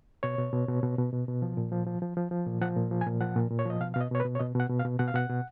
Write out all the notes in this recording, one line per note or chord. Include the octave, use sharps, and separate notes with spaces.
B2 C#5
B2
B2
B2
B2
B2
B2
B2
F3
A#2
F3
F3
F3
F3
F3
A#2
F3 F#5
A#2
F3
G#5
A#2
F3 F#5
A#2
A#2
C#5
F3 D#5
B2 F5
B2 F5
D#5
B2 C#5
B4
B2
C#5
B2 D#5
B2 F#5
B2
F5
B2
B2 F#5
F5
B2 F#5
B2